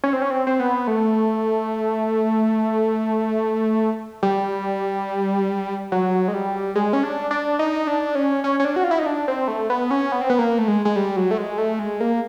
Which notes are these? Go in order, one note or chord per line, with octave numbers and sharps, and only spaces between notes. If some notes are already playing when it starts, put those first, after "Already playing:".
C#4
C4
C#4
C4
C4
B3
A3
G3
F#3
G#3
G3
G#3
C#4
D4
D4
D#4
D4
C#4
C#4
C#4
D4
F#4
F4
E4
D#4
D4
C4
A3
B3
C#4
B3
C4
B3
A#3
A3
G#3
G#3
G3
F#3
A3
G#3
A3
G#3
A#3